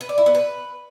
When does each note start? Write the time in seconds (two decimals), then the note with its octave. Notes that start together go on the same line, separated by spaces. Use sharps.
0.01 B4
0.09 D5
0.18 E4
0.26 B3
0.35 B4